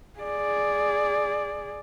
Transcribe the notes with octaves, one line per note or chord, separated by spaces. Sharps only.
G#4 D5